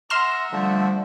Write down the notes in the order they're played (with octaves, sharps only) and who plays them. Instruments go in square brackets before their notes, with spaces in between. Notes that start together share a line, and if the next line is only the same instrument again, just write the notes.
[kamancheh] E5 F#5 [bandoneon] A#5 [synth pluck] C6 F6 E7
[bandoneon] D3 F3 A3 [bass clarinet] G3